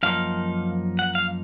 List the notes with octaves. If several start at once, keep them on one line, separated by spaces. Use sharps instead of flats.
F#2 F3 A#3 D#4 F5
F#5
F5